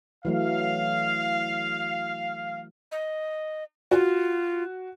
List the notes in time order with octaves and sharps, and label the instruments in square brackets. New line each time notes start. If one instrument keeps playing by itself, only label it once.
[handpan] E3 F#3 A3 [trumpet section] F5
[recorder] D#5
[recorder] F4 [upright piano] F#4